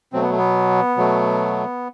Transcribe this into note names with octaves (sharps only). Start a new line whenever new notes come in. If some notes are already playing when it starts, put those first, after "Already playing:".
B2 F#3 A3 C4
B3
A3
B3
B2 F#3 A3